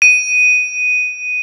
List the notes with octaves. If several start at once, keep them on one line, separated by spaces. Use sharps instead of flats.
D#7